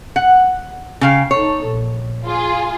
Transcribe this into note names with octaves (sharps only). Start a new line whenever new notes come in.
F#5
C#3 F5 G5
D#4 A4 C#5
A#1
F4 G#4